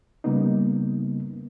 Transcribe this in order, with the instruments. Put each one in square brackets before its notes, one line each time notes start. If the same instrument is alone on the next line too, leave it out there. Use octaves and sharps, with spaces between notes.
[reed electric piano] C#3 G3 A#3 B3 D#4